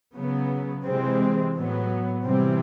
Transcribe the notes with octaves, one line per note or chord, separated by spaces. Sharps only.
C#3 F#3 B3
C3 E3 G#3 C4
A2 F#3 B3
C3 E3 G3 C4